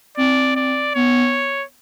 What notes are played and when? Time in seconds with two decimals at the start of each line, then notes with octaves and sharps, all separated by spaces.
0.17 C4 D5
0.56 D5
0.95 B3 C#5